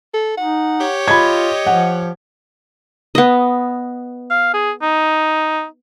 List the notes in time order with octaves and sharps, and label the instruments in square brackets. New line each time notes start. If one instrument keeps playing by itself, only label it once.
[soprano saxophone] A4
[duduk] D#4 [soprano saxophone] F#5
[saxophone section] G4 C#5
[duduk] F4 [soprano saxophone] D#5 [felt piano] B5 G#6
[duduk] F3 [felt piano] F#5
[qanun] B3 D#5
[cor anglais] F5
G#4
D#4